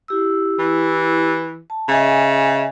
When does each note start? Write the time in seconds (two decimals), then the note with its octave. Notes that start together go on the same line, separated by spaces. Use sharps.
0.08 E4 G4 E6
0.59 E3
1.70 A5
1.88 C#3 D#5 E5 G#5